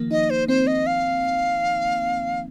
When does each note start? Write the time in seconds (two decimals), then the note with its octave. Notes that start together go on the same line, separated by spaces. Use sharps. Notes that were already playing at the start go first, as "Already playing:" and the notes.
Already playing: D#3 F3 A#3
0.11 D#4 D#5
0.30 C5
0.48 C4 C5
0.67 D#5
0.87 F5